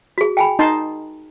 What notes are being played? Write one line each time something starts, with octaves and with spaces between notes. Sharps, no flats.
F#4 G#4
G5 G#5 B5
D#4 A5 C6